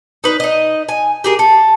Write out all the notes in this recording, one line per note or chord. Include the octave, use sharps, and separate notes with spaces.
D#4 B4
D#4 D#5
G#5
G4 G#4 A#4
A4